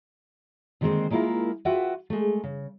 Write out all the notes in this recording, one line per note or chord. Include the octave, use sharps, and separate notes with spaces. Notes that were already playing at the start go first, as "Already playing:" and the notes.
D3 D#3 G#3 A#3 C4 C5
G#3 A#3 D4 E4 F4 A#4
F4 F#4 B4 E5 F#5 G5
G#3 A3
C#3